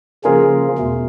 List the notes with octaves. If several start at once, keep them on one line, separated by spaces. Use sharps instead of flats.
C#3 F3 A#3 C#4 F4 G#4 A#4
E2 B2 A3